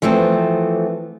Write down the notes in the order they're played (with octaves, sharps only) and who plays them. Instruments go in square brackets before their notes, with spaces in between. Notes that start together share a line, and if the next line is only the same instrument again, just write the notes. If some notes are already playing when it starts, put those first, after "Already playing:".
[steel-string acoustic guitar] E3 F3 A3 B3 C4